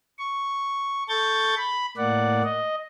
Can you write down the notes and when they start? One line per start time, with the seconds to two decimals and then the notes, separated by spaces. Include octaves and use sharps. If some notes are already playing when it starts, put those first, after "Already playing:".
0.19 C#6
1.09 A4 C#6 G6 A6
1.57 B5
1.97 A2 A#3 D5 F#5
2.44 D#5